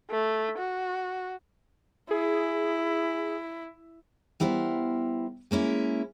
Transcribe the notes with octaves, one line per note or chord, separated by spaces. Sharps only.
A3
F#4
E4 G#4
G3 B3 E4 A#4 C5
G#3 A#3 C#4 E4